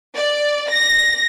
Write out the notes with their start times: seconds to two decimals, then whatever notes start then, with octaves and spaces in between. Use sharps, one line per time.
0.14 D5
0.68 A#6